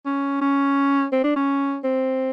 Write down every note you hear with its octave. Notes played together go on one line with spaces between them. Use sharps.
C#4
C#4
C4
D4
C#4
C4